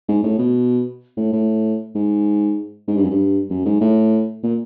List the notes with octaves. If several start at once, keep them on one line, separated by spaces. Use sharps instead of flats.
G#2
A2
B2
A2
A2
G#2
G#2
G2
F#2
G2
F#2
G#2
A2
A#2